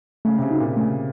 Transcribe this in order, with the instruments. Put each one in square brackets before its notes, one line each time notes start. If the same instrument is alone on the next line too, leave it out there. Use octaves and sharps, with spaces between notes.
[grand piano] C#3 [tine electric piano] A3
[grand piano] C3
C#3
[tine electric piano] D#4 F#4
[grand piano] A#2
[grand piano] C#3 [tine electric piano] A3